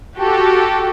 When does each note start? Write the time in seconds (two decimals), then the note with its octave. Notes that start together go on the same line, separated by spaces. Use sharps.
0.18 F#4 G4 A4